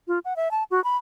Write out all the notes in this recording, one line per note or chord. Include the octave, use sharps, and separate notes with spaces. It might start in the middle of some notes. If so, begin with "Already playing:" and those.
F4
F#5
E5
A5
F#4
B5